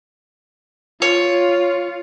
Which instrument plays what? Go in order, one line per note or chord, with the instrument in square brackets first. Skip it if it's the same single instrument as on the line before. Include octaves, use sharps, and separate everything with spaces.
[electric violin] F4 [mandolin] C#5